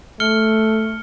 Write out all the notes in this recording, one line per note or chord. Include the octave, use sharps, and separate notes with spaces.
A3 F6 C#7 G7